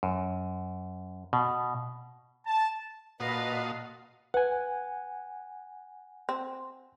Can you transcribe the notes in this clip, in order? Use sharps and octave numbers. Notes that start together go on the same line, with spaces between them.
F#2
B2
A5
A#2 F#4 B4 D#5 F5 A5 D#6
B4 F#5 G#5
C4